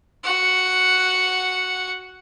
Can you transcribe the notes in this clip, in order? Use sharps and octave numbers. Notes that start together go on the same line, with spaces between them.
F#4 F#5